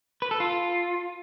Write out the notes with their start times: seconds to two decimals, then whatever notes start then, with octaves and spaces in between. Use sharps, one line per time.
0.22 B4
0.31 A4
0.40 F4